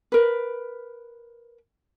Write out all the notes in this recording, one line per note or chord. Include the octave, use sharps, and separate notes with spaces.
A#4 B4